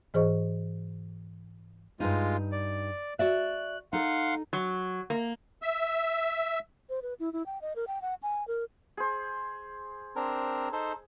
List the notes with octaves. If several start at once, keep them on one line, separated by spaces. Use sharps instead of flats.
G#2 E3 G#4 C5 D#5 C#6
G2 G#3 D#4 F4
D5
F#4 D5 E5 F#6
D#4 A4 F5 F#5 C6
F#3
A#3
E5
C5
B4
E4
E4
G5
D#5
A#4
G5
F#5
G#5
A#4
G#4 C5
C4 D4 A#4
D#4 A4 C5